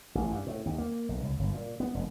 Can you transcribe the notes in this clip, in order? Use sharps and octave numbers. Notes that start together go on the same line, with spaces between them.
A1
G2
A2
D#2
A#3
B1
C#2
G1
A#2
B3
F1